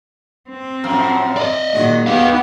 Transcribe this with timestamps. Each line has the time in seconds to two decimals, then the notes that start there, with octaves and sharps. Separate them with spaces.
0.49 C4
0.84 F#2 A2 F3
1.37 D5 D#5
1.74 A#2 D#3 G#3 F#4
2.06 B3 D#4 G4 F5